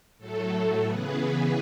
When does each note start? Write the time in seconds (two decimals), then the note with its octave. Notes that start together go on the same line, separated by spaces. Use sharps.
0.18 A2 F#3 A3 A4
0.85 C#3 E3 B3 G#4 B4